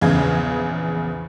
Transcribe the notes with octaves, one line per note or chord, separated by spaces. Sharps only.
A#1 E2 C#3 F5 G#6